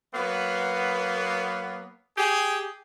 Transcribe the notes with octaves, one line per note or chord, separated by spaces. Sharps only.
F#3 A#3 B3
G4 G#4